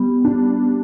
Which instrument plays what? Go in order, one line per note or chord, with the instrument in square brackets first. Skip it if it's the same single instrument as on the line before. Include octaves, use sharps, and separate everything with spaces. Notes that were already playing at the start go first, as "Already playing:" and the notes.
Already playing: [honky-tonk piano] G3 [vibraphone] B3
[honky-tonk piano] D4